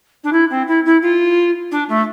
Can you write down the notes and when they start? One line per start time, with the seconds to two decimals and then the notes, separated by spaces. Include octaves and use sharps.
0.23 D4
0.32 E4
0.50 C4
0.67 E4
0.85 E4
1.02 F4
1.71 D4
1.89 A3